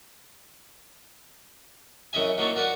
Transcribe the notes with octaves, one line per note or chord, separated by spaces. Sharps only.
F#2 C#3 E4 D#5 E5 G#5
F#3 A#3 D#4 E4 A5 C#6
F#4 A#4 B4 D5 F#5